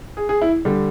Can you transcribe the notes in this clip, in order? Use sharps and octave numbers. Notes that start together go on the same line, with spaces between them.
G#4
G#4
E4
D3 G3